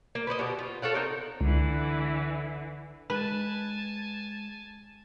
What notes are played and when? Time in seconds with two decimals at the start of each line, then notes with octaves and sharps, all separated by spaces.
0.15 A#3
0.27 B4 C5 D5 D#5
0.39 B2 F#4 G4
0.59 F4
0.82 A4 C#5 F5 F#5
0.94 C4 D#4 A#4
1.41 C#2 D3 E3
3.10 G#3 B4 G#5 A5